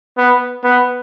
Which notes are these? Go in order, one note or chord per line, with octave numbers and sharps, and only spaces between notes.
B3
B3